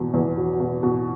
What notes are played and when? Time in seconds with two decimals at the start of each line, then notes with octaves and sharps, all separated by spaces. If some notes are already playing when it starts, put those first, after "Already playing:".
Already playing: E2 B2
0.14 E2
0.37 F#3
0.60 B2
0.83 B2